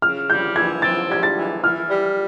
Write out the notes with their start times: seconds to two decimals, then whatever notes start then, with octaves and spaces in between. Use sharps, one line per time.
0.02 C#3 F6
0.30 G3 G6
0.56 E3 G#6
0.82 C4 A6
1.09 G3 G#6
1.23 A6
1.36 E3
1.63 E3 F6
1.90 G3